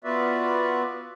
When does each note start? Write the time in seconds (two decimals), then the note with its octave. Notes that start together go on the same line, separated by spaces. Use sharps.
0.04 B3 F4 F#4 B4 D5 E5